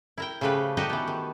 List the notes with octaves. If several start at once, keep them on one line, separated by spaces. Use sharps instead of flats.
E4 A#4 G5
C#3 F3 A3 G4 B4
D#4 F#4 G4 A4 D5 D#5
E3 B3
D#3